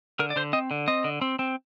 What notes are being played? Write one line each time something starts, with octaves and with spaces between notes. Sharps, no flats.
D3 A#4
D5
D3 C5
C4 D#5
D3
C4 D#5
D3
C4
C4